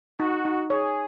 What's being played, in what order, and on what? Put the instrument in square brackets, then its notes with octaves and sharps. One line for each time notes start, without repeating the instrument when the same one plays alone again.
[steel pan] D#4 [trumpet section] F#4
[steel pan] D#4
[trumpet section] G#4 [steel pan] C#5